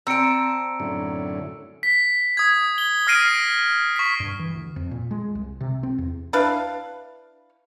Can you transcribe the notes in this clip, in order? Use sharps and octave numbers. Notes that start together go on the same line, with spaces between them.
C4 D5 A5 A#5 E6 C#7 D7
F#2 A2 D3
B6
D#6 G#6
G7
D#6 F6 A#6 C7 D7 D#7
C#6 B6
G2
E3
D2
F2
A#2
G#3
C2
C3
C4
E2
D4 E4 B4 F5